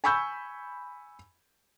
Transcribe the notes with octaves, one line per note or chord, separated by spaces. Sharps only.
G#5 B5 C#6 E6 G6